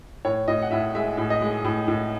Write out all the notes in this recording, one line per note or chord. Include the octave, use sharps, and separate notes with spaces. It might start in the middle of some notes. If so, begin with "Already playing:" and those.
A2 C#5
A2 D#5
F#5
A2 E5
G#3 E5
A2
D#5
G#3
A2
A2